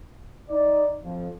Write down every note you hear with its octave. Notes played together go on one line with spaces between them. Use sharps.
D#4 D5
F2 F3